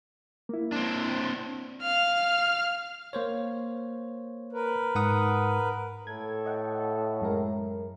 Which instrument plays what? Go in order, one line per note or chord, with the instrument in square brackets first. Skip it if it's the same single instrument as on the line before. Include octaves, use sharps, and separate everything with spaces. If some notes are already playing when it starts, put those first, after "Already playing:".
[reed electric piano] A#3 E4
[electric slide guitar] C4 D4
[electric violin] F5 F6
[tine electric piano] A#3 C5 C#5
[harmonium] A#4 B4
[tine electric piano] G#2 F#5 D#6
[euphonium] A2 [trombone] A4 [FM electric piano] G#6
[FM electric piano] D#5 F#5 G5
F#2 G#3 A#4